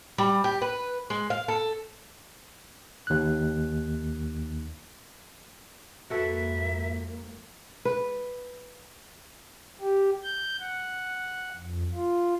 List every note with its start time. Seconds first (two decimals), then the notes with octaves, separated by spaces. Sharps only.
0.18 G3
0.44 G4
0.62 B4
1.10 G#3
1.30 F5
1.48 A4
3.07 D#2 F#6
6.10 F2 G#2 A#3 F#4 A4 B4 E5
7.85 B4
9.81 G4
10.24 G6
10.60 F#5
11.56 F2
11.94 F4